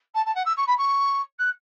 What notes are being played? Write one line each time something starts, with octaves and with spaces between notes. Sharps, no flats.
A5
A5
F#5
E6
C#6
B5
C#6
F#6